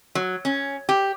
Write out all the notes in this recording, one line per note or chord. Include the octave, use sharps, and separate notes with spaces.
F#3
C#4
G4